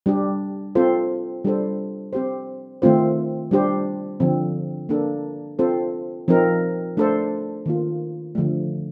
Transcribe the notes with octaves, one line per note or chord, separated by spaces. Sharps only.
G3 D4 G4
C4 F4 A4 C5
G3 D4 A4 C5
C4 G4 C5
D#3 A3 C4 F4 C5
G3 D4 G4 C5
D3 F3 C4
A#3 D4 A4
C4 F4 A4 C5
F3 C4 D#4 A#4
A3 D4 A4 C5
D#3 A#3 F4
D3 F3 A3